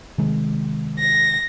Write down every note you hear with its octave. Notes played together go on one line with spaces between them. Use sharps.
C3 D#3 G#3
A#6